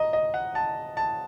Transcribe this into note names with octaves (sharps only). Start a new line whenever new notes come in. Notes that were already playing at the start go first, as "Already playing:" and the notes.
Already playing: D#5 A#5
D#5
F#5
A5
A5